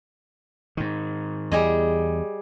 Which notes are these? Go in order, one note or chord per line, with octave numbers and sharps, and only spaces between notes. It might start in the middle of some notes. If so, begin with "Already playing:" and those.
G#2 D#3
E2 G3 G#4 D#5